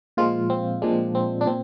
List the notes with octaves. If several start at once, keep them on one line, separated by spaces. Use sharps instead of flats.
A#2 F3 G#3 F4
C4
A#2 F3 G#3 D4
C4
D4
A#2 C4